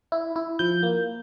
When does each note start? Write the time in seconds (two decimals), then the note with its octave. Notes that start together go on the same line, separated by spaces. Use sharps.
0.12 E4
0.36 E4
0.59 F3 G6
0.83 A#3